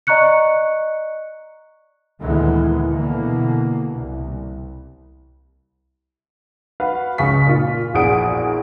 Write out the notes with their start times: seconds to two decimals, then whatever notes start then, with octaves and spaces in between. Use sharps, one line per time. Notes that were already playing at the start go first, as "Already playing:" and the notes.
0.07 D5 D#5 A#5 C#6 F#6 C#7
2.21 D2 A#2 D#3 E3 G#3 B3
2.88 B2 D3 E3 A#3
3.94 C2
6.80 F#4 B4 F5
7.18 C#2 C#3 C#6 B6
7.46 A#2 F4
7.94 A#1 E2 F#4 G#4 D#6 D7